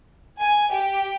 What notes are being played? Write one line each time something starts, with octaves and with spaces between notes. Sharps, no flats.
G#5
G4